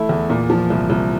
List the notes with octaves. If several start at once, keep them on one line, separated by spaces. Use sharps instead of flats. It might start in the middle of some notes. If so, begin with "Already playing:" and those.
Already playing: E3 A3 E4
E2
A#2
F3
C2
C2